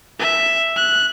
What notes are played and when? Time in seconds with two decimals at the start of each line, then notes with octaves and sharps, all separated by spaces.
0.19 E5
0.77 F#6